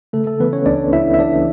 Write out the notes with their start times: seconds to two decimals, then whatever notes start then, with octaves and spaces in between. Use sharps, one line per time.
0.13 C#3 A3 A4
0.26 A3 A4
0.40 E3 B3 B4
0.53 C#4 C#5
0.66 C#2 D4 D5
0.92 C#2 E4 E5
1.14 E5
1.19 E3 D4 D5